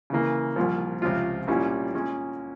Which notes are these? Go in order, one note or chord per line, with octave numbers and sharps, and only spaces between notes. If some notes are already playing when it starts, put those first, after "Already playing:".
C#3 E3 A#3
C2 A#2 F3
C#2 C3 F3 C4 F4
C2 A#2 G3 C#4 E4
A#2 G#3 C#4